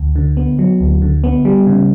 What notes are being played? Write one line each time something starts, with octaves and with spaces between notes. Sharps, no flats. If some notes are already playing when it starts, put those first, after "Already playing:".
Already playing: D2
D3
B3
F#3
D2
D3
B3
G3
C#3